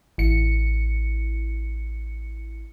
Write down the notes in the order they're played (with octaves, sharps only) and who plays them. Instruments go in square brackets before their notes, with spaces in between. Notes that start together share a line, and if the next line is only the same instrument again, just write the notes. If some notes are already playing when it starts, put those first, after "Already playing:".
[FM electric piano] A1 C#7